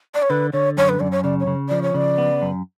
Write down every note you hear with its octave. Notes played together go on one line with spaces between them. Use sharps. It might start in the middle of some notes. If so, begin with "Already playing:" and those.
D5
C#5
D3 B4
D3 C#5
F#2 C#5
B4
F#2 D5
C#5
C#3 D5
C#5
C#3
F3 D5
C#5
C#3 D5
B3
F#2